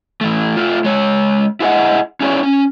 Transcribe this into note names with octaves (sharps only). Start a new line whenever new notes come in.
E3 A3
A3 F4
G#3 C#5
E4 F4 G#4 C5 D#5 F#5
C#4 E4 G#4 A4 C#5 D5
C#4